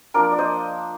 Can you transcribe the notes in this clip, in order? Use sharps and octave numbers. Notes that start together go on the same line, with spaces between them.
F3 A#3 D4 A#4 D5
D5
C5 D#5